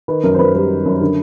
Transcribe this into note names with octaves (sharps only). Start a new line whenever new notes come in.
D#3 B4
F#2 A#4
C5
F#2 B4
G3 B4
D#3
F#2
D3